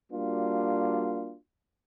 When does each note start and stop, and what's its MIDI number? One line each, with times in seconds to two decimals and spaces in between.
0.12 1.36 55
0.12 1.36 58
0.12 1.36 62
0.12 1.36 65
0.12 1.36 66